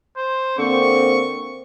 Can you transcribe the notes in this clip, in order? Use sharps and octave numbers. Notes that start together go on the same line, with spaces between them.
C5
D3 A#3 C4 C#6